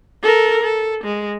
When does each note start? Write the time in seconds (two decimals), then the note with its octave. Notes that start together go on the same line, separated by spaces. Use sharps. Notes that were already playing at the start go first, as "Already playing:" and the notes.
0.23 A4 A#4
0.63 A4
1.04 G#3